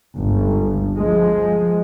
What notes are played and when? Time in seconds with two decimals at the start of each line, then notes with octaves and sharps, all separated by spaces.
0.17 G1 C#2
0.95 F3 G#3